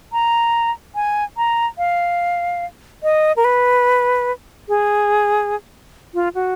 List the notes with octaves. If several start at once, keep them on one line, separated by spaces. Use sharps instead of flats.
A#5
G#5
A#5
F5
D#5
A#4
B4
G#4
F4
F#4